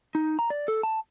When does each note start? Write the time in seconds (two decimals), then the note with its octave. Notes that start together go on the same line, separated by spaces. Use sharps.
0.15 D#4
0.39 A#5
0.50 D5
0.68 A4
0.83 A5